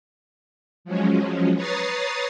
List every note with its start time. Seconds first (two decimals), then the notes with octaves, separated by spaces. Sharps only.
0.85 F3 F#3 G#3 C#4
1.55 B4 C#5 A#5 D#6 A6 C7